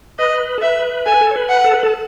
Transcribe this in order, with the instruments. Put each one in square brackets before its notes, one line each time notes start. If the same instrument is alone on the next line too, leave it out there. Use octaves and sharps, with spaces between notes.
[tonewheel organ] B4 [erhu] D#5
[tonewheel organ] A4
[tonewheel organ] B4 [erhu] E5
[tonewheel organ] A4 [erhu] G#5
[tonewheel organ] B4
A4
C#5
B4
[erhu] F#5
[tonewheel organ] A4
B4
A4